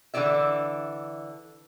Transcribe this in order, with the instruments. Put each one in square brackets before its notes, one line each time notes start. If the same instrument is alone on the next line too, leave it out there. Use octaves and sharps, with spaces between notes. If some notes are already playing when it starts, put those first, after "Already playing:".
[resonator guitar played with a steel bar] D3 E3 E4 D5 E5